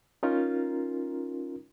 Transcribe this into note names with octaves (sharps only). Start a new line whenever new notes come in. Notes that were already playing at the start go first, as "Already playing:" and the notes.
C#4 D#4 F4 A#4